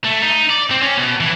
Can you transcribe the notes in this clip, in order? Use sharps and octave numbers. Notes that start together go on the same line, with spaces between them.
A3
D#4
D5
C4
C#4
B2
E3